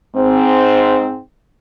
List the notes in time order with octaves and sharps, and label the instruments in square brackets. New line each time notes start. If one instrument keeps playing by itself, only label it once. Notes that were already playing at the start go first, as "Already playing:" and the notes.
[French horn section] G#2 C4